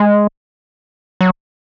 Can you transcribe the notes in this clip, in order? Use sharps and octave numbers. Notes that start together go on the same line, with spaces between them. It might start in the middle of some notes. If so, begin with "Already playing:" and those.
Already playing: G#3
F#3